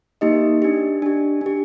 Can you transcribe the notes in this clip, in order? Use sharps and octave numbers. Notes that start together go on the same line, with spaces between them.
A#3 D#4 G4 D#5
D4 G4
D4 G4
D4 G4